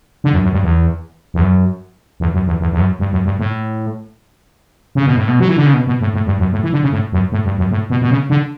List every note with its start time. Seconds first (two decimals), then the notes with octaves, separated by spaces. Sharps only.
0.24 D3
0.33 F#2
0.43 F#2
0.53 G2
0.63 E2
1.34 E2
1.41 F#2
2.20 E2
2.34 F#2
2.47 E2
2.60 E2
2.72 E2
2.79 F#2
2.99 G2
3.12 F#2
3.25 G2
3.39 A2
4.95 C#3
5.06 B2
5.16 A2
5.28 B2
5.40 F#3
5.48 E3
5.57 D3
5.66 C#3
5.74 B2
5.87 B2
6.01 A2
6.14 A2
6.26 G2
6.39 F#2
6.52 A2
6.63 E3
6.73 D3
6.83 C#3
6.92 A2
7.12 F#2
7.32 A2
7.45 G2
7.58 F#2
7.71 A2
7.90 B2
8.02 B2
8.11 C#3
8.30 D3